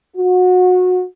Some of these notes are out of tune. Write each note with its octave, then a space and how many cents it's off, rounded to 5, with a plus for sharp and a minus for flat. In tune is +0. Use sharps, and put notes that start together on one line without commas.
F#4 -25